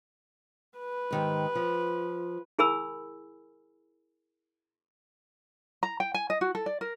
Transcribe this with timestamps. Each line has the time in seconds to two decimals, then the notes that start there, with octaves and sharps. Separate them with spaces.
0.78 B4
1.11 G#2 D#3 G4
1.55 F3
2.59 E4 G#4 A#4 G#5 B5 E6
5.83 A#5
6.00 G5
6.14 G#5
6.30 D#5
6.41 F#4
6.55 A4
6.66 D5
6.81 A#4